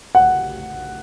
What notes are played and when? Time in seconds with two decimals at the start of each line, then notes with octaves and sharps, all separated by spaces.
0.15 F#5